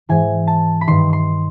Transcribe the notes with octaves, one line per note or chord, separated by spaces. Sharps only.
G#2 E3 G#5
A5
B5
G2 D#3 C6
C6